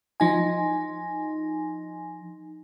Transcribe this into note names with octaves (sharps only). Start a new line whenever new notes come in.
F3 D#4 G#5